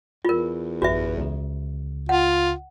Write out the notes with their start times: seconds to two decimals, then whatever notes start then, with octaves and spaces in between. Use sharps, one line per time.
0.25 E2 F4 A#4
0.82 A1 F#2 F#4 B4 E5
1.17 C#2 C#3
2.09 F4 F#5